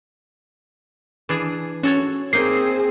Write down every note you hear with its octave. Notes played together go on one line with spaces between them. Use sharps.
E3 D4 G#4
C#4 F#4 A4 C#5
A#3 C4 D#4 G#4 G5 C7